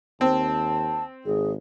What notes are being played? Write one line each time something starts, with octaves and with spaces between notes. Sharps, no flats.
D#2 C4 A5
G#1 G#4